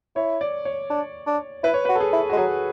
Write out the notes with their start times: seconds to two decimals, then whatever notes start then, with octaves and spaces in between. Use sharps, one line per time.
0.16 E4 C#5
0.41 D5
0.65 C#5
0.90 D4
1.27 D4
1.64 E4 B4
1.74 C#5
1.85 F#4 B4
1.95 A4
2.00 G#4
2.13 E4
2.30 G#3 F#4
2.37 F#3 G#4